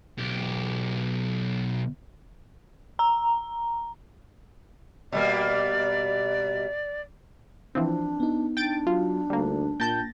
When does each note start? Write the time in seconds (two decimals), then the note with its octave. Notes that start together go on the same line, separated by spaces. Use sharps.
0.19 B1 G4
2.99 A#5
5.12 B2 G3 A#3 D5
7.75 E3 F3 C4 D4
8.20 B3 D#4
8.57 D4 G5 A6 D7
8.87 F#3 F4
9.30 D2 G3 A#3
9.80 A#2 A#3 G5 A5 G6 A6 A#6